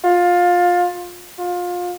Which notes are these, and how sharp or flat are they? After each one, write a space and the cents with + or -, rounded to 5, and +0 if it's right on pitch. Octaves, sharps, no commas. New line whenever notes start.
F4 +20
F4 +25